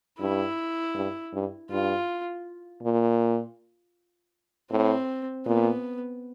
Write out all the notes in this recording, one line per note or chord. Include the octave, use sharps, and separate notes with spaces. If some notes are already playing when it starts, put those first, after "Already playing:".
G2 E4
G2
G2
G2 F4
A#2
A2 C4
A#2 B3